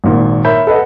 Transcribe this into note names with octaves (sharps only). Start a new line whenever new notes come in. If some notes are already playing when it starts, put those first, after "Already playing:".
G#1 A#2 D#3
A#4 C#5 E5 B5 G6
A4 B4 D#5 F#5